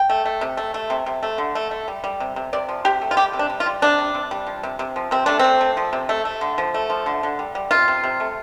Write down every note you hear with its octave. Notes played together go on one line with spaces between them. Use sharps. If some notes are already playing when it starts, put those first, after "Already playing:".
Already playing: G5
A3
A3
C3
A3
A3
C3
C3
A3
D3
A3
A3
G3
G3
C3
C3
C3 D5
F3
C3 G4
A3
F4
G3 G4
C3
D4
G3
F4
G3
C3 D4
G3
C3
G3
F3
C3
C3
F3
C3 C4
A3 D4
A3 C4
A3
F3
C3
A3
A3
D3
F3
A3
F3
D3
D3
G3
G3
C3 F4
C3
C3
A3